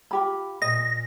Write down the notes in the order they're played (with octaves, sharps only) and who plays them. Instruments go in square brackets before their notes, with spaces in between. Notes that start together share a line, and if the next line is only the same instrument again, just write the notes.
[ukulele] F4 G4 B5
[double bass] A#2 [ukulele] D#5 [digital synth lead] A#6